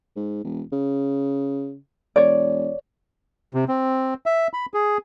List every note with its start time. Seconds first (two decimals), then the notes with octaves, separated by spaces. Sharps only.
0.16 G#2
0.44 E1
0.72 C#3
2.16 E1 C#5 D5
3.54 C3
3.68 C4
4.26 E5
4.53 B5
4.74 G#4